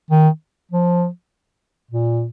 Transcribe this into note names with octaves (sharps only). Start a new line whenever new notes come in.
D#3
F3
A#2